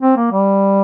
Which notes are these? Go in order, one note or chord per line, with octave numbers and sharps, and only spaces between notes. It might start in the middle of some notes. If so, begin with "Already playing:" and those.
C4
A#3
G3